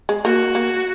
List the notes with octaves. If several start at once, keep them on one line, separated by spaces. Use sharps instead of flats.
G#3
A#3 F#4
A#3